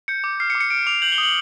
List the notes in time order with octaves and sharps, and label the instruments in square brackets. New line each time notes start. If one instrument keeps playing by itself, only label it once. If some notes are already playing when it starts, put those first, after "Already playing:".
[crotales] G6 C#7
D6
F6 C7
C#7
D6
C#7
F6 D7
D6 F7
G6 F#7
G7
D#6
F#7